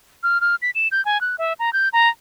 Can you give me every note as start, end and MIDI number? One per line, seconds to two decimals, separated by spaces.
0.23 0.40 89
0.41 0.56 89
0.62 0.70 95
0.75 0.88 100
0.92 1.04 91
1.05 1.20 80
1.21 1.36 90
1.38 1.53 76
1.59 1.72 82
1.73 1.89 91
1.93 2.09 82